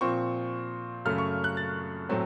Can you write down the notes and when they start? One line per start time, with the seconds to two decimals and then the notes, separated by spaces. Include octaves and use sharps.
0.01 A#2 F3 C4 C#6
1.05 F#2 C#3 A3 F6
1.18 C#6
1.44 F#6
1.57 A6
2.09 A2 F#3 A3 C4